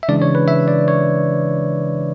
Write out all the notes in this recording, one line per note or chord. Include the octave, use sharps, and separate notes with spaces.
E5
C#3 E3 G#3 D4 D5
C#5
B4
E5
D5
C#5